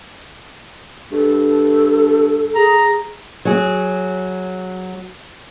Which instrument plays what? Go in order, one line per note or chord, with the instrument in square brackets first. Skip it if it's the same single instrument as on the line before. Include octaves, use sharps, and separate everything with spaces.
[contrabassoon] G2 [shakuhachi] A4
[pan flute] G#4 [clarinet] A#5
[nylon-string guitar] F#3 G#4